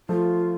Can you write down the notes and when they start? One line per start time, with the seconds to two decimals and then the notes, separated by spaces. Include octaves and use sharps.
0.09 F3 A3 F4